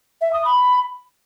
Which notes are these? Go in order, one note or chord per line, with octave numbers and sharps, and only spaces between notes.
E5
D#6
B5